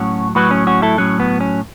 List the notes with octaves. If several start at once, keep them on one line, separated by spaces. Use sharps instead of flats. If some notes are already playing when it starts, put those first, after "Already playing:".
Already playing: A2 F#3 C#4 F#4
A2 F#3 F#4 B4
C#4
C#4 F#4
E4 A4
A2 F#3 C#4
B3
C#4